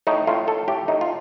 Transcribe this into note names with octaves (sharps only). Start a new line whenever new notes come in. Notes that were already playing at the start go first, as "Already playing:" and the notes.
A2 D#4
A2 F4
A2 A4
A2 G4
A2 D#4
F4